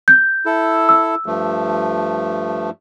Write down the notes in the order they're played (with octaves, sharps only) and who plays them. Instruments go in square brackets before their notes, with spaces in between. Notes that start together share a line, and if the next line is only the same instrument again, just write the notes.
[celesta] G6
[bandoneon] E4 A4
[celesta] E6
[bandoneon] G2 F3 A3